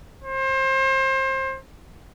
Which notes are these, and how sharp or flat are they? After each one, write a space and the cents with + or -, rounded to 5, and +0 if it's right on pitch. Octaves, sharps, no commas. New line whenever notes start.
C5 +30